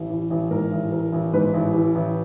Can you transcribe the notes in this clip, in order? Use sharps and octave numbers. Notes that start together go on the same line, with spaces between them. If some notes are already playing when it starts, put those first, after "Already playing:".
Already playing: A1
E3
A1
G#2 A#4
A1
E3 A#4
A1
G#2 B4
A1
E3
A1